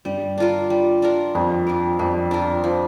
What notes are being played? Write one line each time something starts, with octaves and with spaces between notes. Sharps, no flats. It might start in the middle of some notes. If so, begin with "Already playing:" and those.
G2 G3
D4 F4 A#4
G3
D4 F4 A#4
F2 G3
D4 F4 A#4
F2 G3
D4 F4 A#4
F3